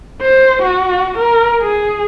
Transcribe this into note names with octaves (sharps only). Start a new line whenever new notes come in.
C5
F#4
A#4
G#4